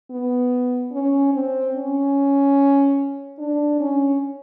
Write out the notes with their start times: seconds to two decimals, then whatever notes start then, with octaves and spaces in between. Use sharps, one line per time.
0.11 B3
0.92 C#4
1.34 C4
1.75 C#4
3.39 D4
3.80 C#4